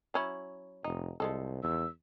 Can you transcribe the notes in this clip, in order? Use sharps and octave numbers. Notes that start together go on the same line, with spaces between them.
F#3 C#4 E4
F1 D#4
C2 F3 G#3 A4
E2 E6